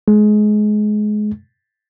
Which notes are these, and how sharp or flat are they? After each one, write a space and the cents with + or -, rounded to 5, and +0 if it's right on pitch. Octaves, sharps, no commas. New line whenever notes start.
G#3 +25